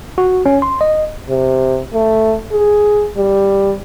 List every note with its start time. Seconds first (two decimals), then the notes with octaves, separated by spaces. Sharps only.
0.18 F#4
0.46 C#4
0.62 C6
0.81 D#5
1.29 C3
1.93 A3
2.52 G#4
3.17 G3